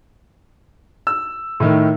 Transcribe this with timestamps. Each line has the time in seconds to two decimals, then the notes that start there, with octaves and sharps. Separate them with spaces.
1.07 E6
1.60 A2 D#3